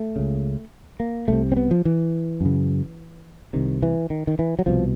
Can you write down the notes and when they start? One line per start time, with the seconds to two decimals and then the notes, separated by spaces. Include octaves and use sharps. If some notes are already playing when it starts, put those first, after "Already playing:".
Already playing: A3
0.16 C#2 C#3
1.00 A#3
1.28 C2 C3 A3
1.52 C4
1.57 B3
1.71 F3
1.85 E3
2.41 F#2 C#3
3.53 C2 C3 D#3
3.83 E3
4.10 D#3
4.27 D#3
4.39 E3
4.59 F#3
4.66 C2 B2 F3